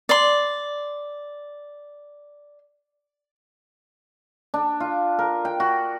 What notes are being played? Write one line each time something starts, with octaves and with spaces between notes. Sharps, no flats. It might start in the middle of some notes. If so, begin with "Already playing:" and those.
D5 C6
D4
F4
A#4
G5
F#4